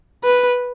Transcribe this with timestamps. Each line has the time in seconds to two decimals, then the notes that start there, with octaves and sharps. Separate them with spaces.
0.24 B4